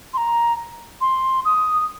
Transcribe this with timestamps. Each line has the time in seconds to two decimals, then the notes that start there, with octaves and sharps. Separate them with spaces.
0.14 C6
0.17 A#5
1.01 C6
1.45 D#6